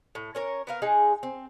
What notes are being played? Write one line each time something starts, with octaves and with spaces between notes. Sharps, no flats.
A2
C#4 A#4 C#5
B3 A#4 F5
G#3 D#4 G#4
C4